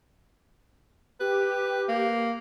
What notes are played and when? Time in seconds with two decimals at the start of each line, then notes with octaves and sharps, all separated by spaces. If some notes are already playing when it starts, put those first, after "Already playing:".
1.20 G4 B4
1.89 A#3